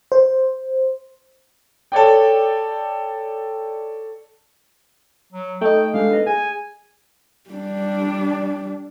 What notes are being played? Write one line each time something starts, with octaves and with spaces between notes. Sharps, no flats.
C5
A4 C#5 D5 G5
F#3
A3 D#4 G5
G#3 D4 G4 F5
B3 B4 D#5
G#4 G#5
G3 D4